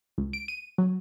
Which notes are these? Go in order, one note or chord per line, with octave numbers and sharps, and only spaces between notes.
C#2
D7
D#7
F#3